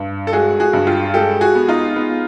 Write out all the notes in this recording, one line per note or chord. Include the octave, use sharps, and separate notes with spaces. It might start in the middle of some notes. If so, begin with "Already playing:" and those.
Already playing: G2
A4
G#3 F#4 G#4
F#4 G#4
G2
F4 G4
G#3 G4 A4
F#4 G#4
B3
D#4 F4
B3